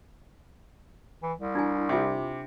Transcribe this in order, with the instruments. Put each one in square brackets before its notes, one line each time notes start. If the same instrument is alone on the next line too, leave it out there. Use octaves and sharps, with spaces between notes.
[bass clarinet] E3
C2
[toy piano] D4 E4 G#5
[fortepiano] C3 [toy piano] F4 D6